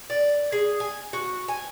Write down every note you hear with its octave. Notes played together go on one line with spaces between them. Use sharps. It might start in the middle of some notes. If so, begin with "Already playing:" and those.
D5
G#4
G#5
F#4
G#5